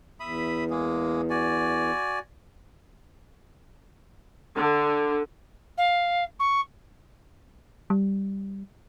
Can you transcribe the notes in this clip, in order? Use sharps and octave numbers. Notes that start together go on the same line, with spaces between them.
E2 E5 B5 D#6
G#3 A#3 G#4
F#4 D5 G#5
D3
F5
C#6
G3